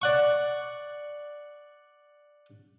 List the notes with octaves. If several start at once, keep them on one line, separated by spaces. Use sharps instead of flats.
D5 F#5 C#6